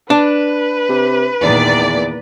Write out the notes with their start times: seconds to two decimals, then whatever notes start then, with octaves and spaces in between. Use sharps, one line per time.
0.10 D4 B4
0.89 C3
1.41 E2 A#2 D#3 D5